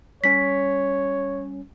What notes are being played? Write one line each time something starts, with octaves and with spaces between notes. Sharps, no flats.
G3 C#4 C#5 B6